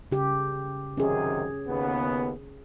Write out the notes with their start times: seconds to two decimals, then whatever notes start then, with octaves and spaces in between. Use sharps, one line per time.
0.12 C#3 G4
0.97 F#2 C3 D#3 C#4 G#4
1.68 D#2 C#3 B3